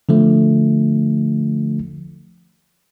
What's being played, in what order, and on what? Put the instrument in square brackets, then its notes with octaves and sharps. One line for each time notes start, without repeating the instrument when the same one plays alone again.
[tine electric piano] D3 F3 A3